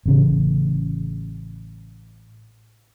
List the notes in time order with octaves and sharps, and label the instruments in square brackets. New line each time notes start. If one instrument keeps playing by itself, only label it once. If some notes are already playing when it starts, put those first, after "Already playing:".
[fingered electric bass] A1 C#3